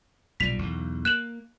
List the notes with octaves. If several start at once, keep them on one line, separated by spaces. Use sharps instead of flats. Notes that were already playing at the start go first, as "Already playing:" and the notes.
B1 A#2 G3 B6 F7
B1 E2
A#3 F#6 E7 F#7